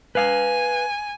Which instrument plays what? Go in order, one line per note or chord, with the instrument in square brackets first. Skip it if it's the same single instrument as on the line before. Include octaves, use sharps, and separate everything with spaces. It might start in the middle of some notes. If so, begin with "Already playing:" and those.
[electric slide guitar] B4 F5 [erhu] G#5